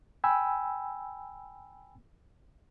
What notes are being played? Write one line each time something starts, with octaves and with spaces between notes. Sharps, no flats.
G5 G#5 B5 E6